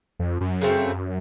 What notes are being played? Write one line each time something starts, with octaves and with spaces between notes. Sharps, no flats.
F2
F#2
C#3 A3 C4